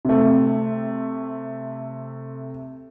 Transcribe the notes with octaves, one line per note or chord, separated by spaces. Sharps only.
C3 A3